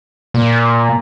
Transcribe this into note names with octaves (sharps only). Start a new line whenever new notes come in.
A#2